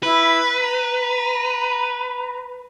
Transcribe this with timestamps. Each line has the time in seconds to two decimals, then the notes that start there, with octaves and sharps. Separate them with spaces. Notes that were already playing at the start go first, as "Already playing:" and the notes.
0.03 E4 B4
0.60 A#5